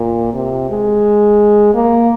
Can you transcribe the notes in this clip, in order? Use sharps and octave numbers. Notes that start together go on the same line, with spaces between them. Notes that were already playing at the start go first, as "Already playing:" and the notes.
Already playing: A#2
C3
G#3
A#3